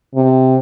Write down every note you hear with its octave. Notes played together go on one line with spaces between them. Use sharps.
C3